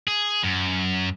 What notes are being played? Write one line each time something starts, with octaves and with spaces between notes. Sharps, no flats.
G#4
F#2